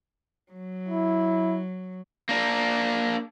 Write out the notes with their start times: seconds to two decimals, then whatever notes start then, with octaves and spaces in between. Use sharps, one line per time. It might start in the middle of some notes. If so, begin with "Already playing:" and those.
0.52 F#3
0.89 E4
2.29 A#3 D4